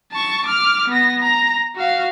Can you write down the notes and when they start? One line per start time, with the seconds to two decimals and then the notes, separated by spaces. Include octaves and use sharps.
0.12 A5 C#6
0.46 D6 F6
0.88 B3 A#6
1.22 A#5
1.76 F#4 F5